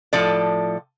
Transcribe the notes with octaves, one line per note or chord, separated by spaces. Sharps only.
A2 F3 A4 D5